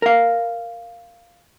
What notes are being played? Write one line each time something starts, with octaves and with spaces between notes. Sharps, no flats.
A#4 F5